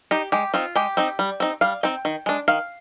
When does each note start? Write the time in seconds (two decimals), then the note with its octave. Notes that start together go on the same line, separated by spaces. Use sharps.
0.11 D#4 G4
0.32 G#3 G4
0.54 C4 D#4 F4
0.75 G#3 G4
0.97 C4 D#4
1.19 G3
1.40 C4 D#4
1.61 G3 F5
1.83 C4 D#4 G5
2.05 D#3
2.26 G#3 D4
2.48 D#3 F5